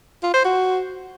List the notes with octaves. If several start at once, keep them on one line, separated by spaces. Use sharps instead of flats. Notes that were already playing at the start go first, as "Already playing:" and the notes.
F4
C5
F#4